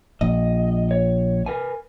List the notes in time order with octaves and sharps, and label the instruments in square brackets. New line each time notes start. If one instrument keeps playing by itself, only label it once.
[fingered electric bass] A#1 [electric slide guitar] D#5
[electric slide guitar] C#5
A#4 B4 G#5